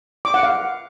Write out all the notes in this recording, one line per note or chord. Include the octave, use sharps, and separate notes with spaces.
D6
F#5
F5